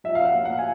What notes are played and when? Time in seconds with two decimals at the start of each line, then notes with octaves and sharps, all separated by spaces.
0.04 F3 E5
0.15 F5
0.20 C#4
0.25 F#5
0.35 A#3
0.45 F#5
0.59 G#5